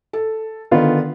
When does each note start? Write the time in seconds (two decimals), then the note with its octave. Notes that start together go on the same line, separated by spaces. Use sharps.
0.13 A4
0.71 D3 D#3 B3 F4